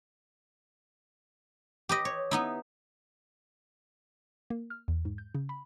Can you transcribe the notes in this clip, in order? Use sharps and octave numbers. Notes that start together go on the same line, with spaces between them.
G4 B4 D#5
C#5
B3 D#4 E4
A#3
F6
E2
G#2
G6
C#3
B5